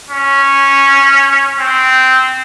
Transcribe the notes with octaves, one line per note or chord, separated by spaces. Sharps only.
C#4
C4